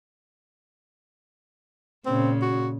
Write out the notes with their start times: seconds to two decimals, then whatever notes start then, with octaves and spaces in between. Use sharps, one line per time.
2.06 A#2 C#3 C4
2.42 F#4